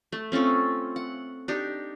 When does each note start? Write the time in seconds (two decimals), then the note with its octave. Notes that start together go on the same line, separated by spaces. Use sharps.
0.12 A3
0.32 C4 C#4 F4 A4
0.96 F#5
1.48 D4 D#4 G4